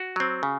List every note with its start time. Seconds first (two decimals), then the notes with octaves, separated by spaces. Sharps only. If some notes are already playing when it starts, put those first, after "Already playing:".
Already playing: F#4
0.16 F#3 C4
0.43 C#3